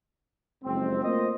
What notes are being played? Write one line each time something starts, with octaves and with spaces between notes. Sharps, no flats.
F#1 F2 G#3 C4
A3 A#3 F4 C5 D#5